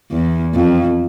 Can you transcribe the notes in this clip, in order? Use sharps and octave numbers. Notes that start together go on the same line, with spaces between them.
E2
F2